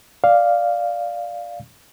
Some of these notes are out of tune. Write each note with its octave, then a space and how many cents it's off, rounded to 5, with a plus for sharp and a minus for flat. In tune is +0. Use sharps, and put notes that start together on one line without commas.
D5 +0 F5 +0